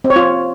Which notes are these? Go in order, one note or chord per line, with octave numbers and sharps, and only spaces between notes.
C4
C#5
F4